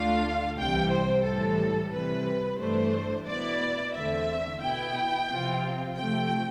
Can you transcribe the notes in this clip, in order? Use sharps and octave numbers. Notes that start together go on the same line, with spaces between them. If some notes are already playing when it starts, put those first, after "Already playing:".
Already playing: D2 D3 A3 D4 F4 F5
C2 C3 E3 G3 G5
C5
A2 E3 G3 A4
C3 E3 G3 B4
G2 E3 A3 D4 C5
B2 B3 E4 D5
E2 D3 A3 C4 E5
B2 B3 E4 G5
C3 F3 C4 F4
C3 F3 A3 G5